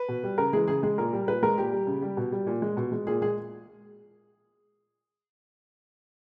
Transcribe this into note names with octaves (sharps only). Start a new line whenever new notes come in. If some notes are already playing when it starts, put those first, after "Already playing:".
Already playing: B4
B2
G3
C#3 A#4
E3 G#3 G#4
C#3 G#4
G#3 G#4
A#2 A#4
G3
A#2 B4
G#3 A#4
A#2 G4
G3
C#3
G3
B2
G3
A#2
G#3
B2
G#3
A#2 G#4
G#3 G#4